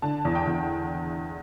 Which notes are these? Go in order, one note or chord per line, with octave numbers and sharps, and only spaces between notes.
D3 A5
E2
G5
E2